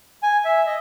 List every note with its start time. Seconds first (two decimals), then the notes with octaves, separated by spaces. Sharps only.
0.23 G#5
0.45 E5
0.67 D#5